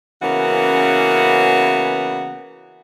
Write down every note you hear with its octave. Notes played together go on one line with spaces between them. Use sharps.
C#3 E3 A#3 B3 C#4 F#4